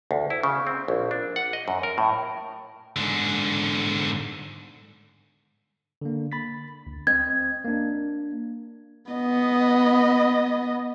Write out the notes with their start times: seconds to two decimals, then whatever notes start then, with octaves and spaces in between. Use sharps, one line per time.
0.11 D2
0.30 E4
0.43 C#3
0.67 C4
0.88 A#1
1.11 D4
1.36 F#5
1.53 D#5
1.68 F#2
1.83 A#4
1.98 A2
2.96 G#2 D3
6.02 D3 A#3
6.32 B5 A6 B6
6.87 D2
7.07 C4 D#5 G#6
7.65 A#3 D4
9.11 B3 D#5